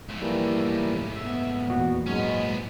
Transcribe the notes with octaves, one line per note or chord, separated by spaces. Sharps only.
G#2 F3 A3
E3 G3 A#3
B3 E5
E2 A#2 F#4
G#2 F#3 G#3 C#4 C#5
C2 B3